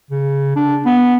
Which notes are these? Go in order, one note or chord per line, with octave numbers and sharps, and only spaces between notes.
C#3
D4
B3